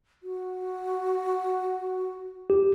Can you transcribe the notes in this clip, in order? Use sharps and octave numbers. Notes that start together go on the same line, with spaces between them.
F#4
G4